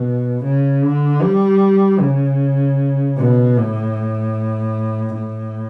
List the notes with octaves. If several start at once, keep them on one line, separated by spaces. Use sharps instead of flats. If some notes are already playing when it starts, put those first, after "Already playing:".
Already playing: B2
C#3
D3
G3
C#3
B2
A2
A2